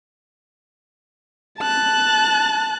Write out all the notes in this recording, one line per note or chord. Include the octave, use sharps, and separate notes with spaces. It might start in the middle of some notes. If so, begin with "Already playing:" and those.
A5 F#6